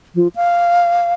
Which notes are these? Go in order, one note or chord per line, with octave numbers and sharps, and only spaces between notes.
F3
F5